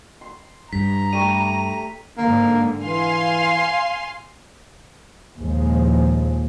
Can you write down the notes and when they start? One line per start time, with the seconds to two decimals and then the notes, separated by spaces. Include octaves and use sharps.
0.21 C6
0.73 G2 A#5 B6
1.13 G3 A3 C#6 D#7
2.18 G#2 D3 A#3
2.84 E3 F5 G#5 C6
5.39 D#2 A#2 F3 G#3